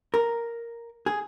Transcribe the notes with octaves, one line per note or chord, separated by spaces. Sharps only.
A#4
G#4